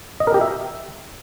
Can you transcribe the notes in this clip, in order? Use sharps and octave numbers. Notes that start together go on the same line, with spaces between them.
D#5
A#4
G4
E5